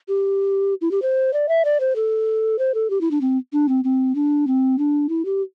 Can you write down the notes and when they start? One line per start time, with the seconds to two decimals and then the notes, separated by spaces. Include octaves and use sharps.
0.08 G4
0.81 E4
0.91 G4
1.02 C5
1.33 D5
1.49 E5
1.65 D5
1.80 C5
1.96 A4
2.59 C5
2.74 A4
2.90 G4
3.01 E4
3.11 D4
3.21 C4
3.53 D4
3.68 C4
3.84 C4
4.15 D4
4.47 C4
4.78 D4
5.09 E4
5.25 G4